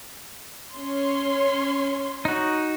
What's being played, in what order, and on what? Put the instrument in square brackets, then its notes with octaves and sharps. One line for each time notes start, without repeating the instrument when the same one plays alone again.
[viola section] C#4 C#5 C6
[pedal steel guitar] D#4 F#4